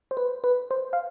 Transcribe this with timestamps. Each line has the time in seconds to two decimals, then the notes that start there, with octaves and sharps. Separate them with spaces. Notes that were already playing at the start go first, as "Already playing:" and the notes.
0.11 C5
0.17 B4
0.44 B4
0.71 C5
0.93 F5